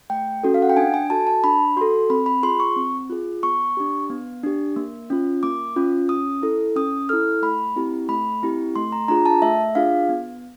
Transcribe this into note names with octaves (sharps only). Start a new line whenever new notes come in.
A3 G5
C#4 F#4 A4
F5
F#5
G5
D4 G#5
G#5
F#4 A4 A5
A5
D4 B5
F#4 A4 C6
C4 B5
B5
F4 G#4 C6
C#6
C4
F4 G#4
B3 C#6
D4 G4
B3
D4 G4
A#3
C#4 F4
A#3 D6
C#4 F4
C#4 D#6
E4 A4
C#4 D#6
E4 A4 F6
A3 B5
C4 E4 G4
A3 B5
C4 E4 G4
A3 C6
A#5
D4 F4 G#4 A#5
A5
A3 E5
D4 F4 G#4 F5
B3